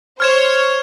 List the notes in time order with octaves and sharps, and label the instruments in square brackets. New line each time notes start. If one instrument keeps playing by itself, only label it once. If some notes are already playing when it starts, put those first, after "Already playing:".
[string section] C5 C#5 [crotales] F6 G#6 E7